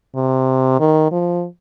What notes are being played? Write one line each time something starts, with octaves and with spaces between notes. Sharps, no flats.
C3
D#3
F3